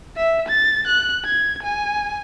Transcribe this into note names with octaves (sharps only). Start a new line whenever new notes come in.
E5
A6
F#6
G#6
G#5